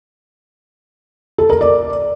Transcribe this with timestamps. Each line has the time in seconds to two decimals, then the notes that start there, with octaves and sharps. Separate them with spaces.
1.38 A4
1.50 A#4
1.61 D5